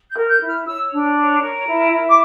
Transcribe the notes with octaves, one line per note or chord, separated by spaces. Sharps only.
G6
A#4
G6
E4
F6
C#5 E6
D4
C#5
A#4
E4
E4
D6